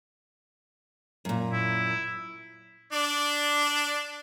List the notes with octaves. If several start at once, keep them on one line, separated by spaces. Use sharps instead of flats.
F#2 A#2
E4
D4 D5